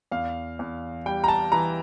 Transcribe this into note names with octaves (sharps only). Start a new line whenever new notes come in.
E2 F5
E2
G3 G5
A#5
A5
E3 A#5